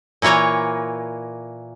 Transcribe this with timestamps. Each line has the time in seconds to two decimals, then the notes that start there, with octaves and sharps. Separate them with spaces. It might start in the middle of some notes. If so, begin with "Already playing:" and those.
0.22 A#2 E3 A#3 C#5 A#5